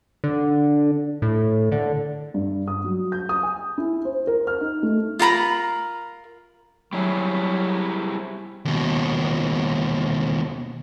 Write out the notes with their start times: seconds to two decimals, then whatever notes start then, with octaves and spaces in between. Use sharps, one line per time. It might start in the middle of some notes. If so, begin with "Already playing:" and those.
0.24 D3
1.22 A2
1.72 D3
2.34 G2
2.68 D#6
2.84 F#3
3.12 G6
3.29 D#6
3.43 G#5
3.78 E4
4.05 C5
4.27 A#4
4.47 F6
4.61 D#4
4.83 A3
5.19 F4 A#4 A#5 B5
6.93 F#3 G3 E4 G#4
8.65 D#2 B2